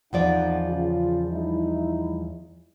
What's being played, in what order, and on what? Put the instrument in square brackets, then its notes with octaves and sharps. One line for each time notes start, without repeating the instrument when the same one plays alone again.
[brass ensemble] G#1 D#4 F#5 [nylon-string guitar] E2 F3 D5
[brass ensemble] C#3 F4
G3 D#4 E4